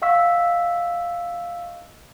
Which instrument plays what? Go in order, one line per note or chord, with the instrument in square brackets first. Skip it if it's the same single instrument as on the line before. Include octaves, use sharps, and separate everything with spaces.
[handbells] D#5 F5 F#5 C#6 E6 B6